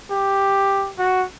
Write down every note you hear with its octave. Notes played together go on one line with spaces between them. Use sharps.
G4
F#4